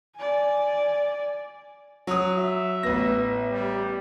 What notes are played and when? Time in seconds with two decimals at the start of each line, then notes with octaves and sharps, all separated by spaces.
0.16 D5 G#5
2.07 F#3 D#6
2.38 E5
2.83 A1 B3 B4 A#6
3.51 G3